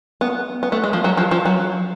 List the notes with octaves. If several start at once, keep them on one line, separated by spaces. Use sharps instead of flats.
B3
B3
A3
G#3
F3
F#3
F3
F3
F#3